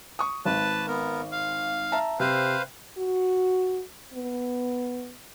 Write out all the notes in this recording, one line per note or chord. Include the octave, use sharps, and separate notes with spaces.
C#6 D#6
G#1 B4 A5
B3 A#4
F5
E5 A5 A#5
C3 B4 C5 F5
F#4
B3